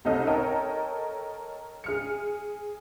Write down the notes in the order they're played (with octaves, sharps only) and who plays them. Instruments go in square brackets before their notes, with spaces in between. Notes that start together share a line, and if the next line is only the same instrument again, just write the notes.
[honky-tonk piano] C2 C#4 D#4 A4 D#5 F6
A4 A#4 C#5 D#5 G5
G#4 F6 C#7